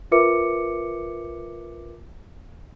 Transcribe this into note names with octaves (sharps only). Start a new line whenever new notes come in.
F4 A#4 B4 E5 D6 C#7